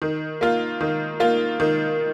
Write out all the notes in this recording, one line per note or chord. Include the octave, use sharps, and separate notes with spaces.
D#3
A#3 F4
D#3
A#3 F4
D#3